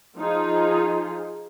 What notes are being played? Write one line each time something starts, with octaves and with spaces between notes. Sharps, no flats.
F3 D#4 F4 G#4